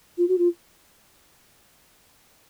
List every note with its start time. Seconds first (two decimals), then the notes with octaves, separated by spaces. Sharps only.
0.18 F4
0.28 F#4
0.38 F4